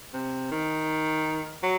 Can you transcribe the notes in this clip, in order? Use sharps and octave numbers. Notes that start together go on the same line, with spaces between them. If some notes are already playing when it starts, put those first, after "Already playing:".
C3
D#3
F#3